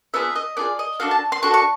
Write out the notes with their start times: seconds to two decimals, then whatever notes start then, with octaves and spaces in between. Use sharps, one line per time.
0.14 B3 D4 F4 G#4 E5
0.36 D#5
0.57 B3 D4 F4 G#4 D5
0.79 D#5
1.00 D4 F#4 A4 F5
1.11 A5
1.32 C6
1.43 D4 F#4 A4 C#6
1.54 C#6